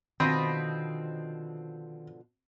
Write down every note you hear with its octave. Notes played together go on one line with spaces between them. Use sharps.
B2 D3 D#3 F3 C4 D#5 A5 B5